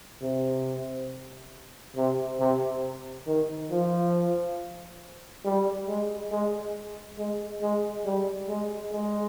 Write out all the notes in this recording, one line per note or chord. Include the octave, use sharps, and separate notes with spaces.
C3
C3
C3
D#3
F3
G3
G#3
G#3
G#3
G#3
G3
G#3
G#3